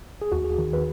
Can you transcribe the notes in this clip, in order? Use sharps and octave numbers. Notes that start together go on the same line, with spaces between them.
G#4
D#2 F#4
G#4
D#3
B4